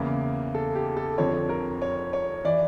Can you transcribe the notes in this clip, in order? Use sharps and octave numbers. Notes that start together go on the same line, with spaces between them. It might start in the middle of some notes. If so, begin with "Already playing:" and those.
Already playing: E2 C#3 E3 A#3
A4
G4
A4
F2 D3 F3 C#5
A#4
C#5
C#5
E3 D5